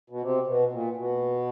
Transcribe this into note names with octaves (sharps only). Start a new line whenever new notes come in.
B2
C3
B2
A#2
B2